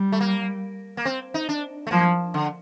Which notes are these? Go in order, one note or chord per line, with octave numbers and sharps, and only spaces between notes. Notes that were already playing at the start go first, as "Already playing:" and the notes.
Already playing: G3
A3
A#3
A#3
C4
D#4
D4
A3
F3 A#3
D3